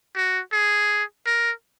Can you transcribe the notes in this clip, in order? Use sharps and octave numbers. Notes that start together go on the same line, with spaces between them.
F#4
G#4
A#4